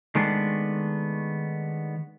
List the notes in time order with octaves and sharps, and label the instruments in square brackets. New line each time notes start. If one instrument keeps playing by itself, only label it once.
[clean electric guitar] D#3 G#3 A3 B3 D4